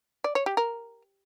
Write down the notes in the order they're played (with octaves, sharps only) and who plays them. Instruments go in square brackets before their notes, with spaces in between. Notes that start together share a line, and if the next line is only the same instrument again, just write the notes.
[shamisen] D5
C#5
G4
A#4